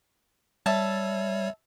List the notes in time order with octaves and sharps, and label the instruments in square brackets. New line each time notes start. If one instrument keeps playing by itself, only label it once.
[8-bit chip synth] G3 C#5 [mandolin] E5 A5